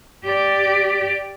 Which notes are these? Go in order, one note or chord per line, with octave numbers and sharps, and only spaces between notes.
G4 D5